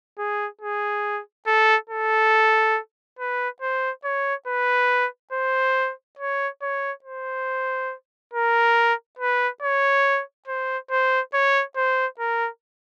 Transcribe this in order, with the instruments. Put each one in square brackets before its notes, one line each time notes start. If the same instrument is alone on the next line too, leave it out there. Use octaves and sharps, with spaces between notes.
[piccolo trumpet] G#4
G#4
A4
A4
B4
C5
C#5
B4
C5
C#5
C#5
C5
A#4
B4
C#5
C5
C5
C#5
C5
A#4